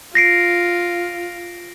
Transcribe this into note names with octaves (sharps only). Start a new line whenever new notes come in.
F4 A#6 C7 D7